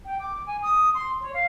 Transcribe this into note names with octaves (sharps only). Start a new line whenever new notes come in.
G5
D6
G#5
D#6
C6
C#5
F5